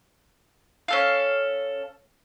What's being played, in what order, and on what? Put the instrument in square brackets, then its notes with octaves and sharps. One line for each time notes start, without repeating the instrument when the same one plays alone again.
[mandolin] C#4 A4 F5